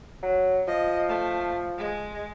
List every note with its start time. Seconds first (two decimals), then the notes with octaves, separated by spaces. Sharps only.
0.23 F#3
0.67 F3 D#5
1.08 A3
1.78 G#3